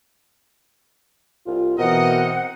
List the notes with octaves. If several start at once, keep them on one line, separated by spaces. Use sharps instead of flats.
C2 F4
B2 E3 C4 A#4 D#5 F#5